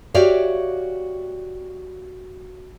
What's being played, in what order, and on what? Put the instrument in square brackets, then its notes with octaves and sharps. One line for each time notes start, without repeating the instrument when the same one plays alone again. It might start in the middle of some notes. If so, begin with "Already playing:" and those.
[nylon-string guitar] F#4 G4 C#5 D5 E5 F5